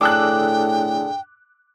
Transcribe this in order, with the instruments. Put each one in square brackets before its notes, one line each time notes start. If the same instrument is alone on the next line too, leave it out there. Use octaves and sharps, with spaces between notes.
[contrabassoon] A2 [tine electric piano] D4 G#4 A4 [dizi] G5 [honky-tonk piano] D6 E6 F#6